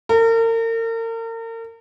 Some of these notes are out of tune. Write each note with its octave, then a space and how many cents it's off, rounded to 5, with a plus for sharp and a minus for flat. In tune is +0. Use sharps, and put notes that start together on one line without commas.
A#4 -40